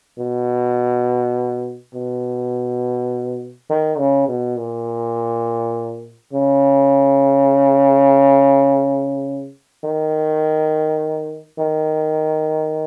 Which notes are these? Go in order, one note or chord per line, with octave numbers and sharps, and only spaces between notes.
B2
B2
D#3
C#3
B2
A#2
C#3
D#3
D#3